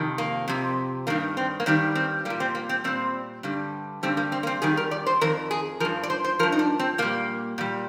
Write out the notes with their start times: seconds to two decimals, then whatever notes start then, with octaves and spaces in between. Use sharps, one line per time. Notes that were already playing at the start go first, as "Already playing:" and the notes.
Already playing: F2 C3 D#3
0.18 A#3
0.48 F2 C3
1.07 G2 D#3 G3 A#3
1.37 C4
1.60 A#3
1.66 G2 D#3 G3 C4
1.95 C4
2.25 G3 A#3
2.30 A#2
2.40 C4
2.55 A#3
2.69 C4
2.84 A#2 G3 C4
3.43 G2 D3 G3
4.03 G2 D3 G3 C4
4.17 A#3
4.32 C4
4.43 A#3
4.47 C4
4.62 F2 D#3 G3 G#4
4.77 A#4
4.91 D5
5.06 C5
5.21 F2 D#3 A#4
5.51 G#4
5.80 F3 A#4
5.85 G2
6.03 D5
6.10 C5
6.24 C5
6.39 F3 A#4
6.43 G2
6.52 D#4
6.59 D4
6.79 C4
6.98 A#2 G3 A#3
7.58 A#2 G3